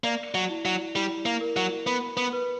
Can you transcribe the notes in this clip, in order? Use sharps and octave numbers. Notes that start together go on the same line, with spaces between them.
A#3 D5
F#3
E4
F#3
G3 E4
A#3
A#4
F#3
B3 B5
B3
B4